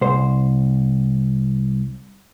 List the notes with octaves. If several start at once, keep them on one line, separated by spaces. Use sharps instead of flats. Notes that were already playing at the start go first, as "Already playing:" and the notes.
C2 C5